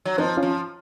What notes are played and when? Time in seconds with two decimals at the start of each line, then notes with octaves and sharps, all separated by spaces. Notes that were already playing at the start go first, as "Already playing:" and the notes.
0.05 F#3
0.18 F3 C4 D#4
0.37 C#4 F4
0.43 F3